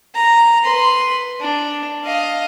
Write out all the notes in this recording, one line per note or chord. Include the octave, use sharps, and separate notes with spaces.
A#5
B4 C6
D4
D#5 F5